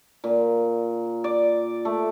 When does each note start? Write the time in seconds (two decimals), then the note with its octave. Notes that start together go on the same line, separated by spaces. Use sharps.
0.24 A#2
1.24 D5
1.85 A3